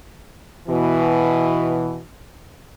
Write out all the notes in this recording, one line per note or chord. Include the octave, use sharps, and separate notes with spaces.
B2 E3